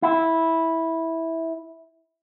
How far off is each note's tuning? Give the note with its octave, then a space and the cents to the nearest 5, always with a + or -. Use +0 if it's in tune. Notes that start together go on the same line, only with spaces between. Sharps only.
E4 -10